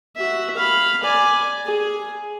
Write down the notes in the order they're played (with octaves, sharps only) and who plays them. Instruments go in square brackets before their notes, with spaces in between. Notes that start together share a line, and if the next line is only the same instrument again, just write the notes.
[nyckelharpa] F#4 E5
F5 B5
D5 G#5
G#4